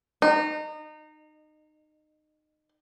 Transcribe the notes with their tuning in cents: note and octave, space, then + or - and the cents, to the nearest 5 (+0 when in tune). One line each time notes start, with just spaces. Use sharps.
D#4 -25